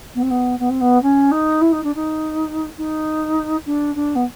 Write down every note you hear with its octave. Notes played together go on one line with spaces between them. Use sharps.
B3
C4
B3
B3
C4
B3
C#4
D#4
E4
D#4
D4
D#4
D#4
D4
D4
B3